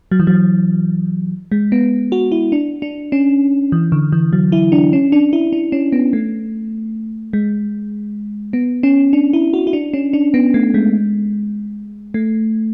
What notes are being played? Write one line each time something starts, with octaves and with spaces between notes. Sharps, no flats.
F#3
E3
F#3
G#3
B3
F#4
E4
D4
D4
C#4
E3
D3
E3
F#3
E4
D4
C#4
D4
E4
D4
C#4
B3
A3
G#3
B3
C#4
D4
E4
F#4
E4
D4
C#4
D4
B3
A3
G#3
A3